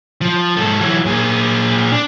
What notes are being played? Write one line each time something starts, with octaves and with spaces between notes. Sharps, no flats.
F3
G#2 A4
E3 F#3
A#2 G#4
D4